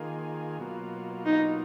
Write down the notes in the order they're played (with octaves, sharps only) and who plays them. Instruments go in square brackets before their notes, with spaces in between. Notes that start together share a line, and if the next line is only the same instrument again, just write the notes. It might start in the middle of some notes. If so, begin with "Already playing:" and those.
Already playing: [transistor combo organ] D#3 A#3 F4 G#4
B2 F#3 A#3 F4
[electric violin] D#4